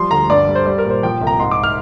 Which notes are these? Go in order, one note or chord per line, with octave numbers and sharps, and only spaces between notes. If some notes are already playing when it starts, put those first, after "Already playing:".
Already playing: F3 G3 C6
D2 A#5
G2 D5
G3
C5
G3 D5
A#4
A#2
C5
F3 G5
C2
A#5
G#2 C6
D6
F6